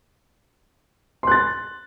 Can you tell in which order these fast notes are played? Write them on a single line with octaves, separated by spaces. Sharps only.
C6 F#6 A6